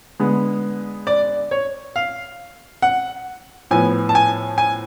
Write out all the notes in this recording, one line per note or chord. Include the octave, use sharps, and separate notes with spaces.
D3 G#3 B3
D5
C#5
F5
F#5
A2 F3 B3 G#5
A5
G#5
G#5